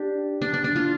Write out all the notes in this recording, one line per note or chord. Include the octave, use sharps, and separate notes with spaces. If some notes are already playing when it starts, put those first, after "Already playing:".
Already playing: D4 G4
D4
D4
D4
F4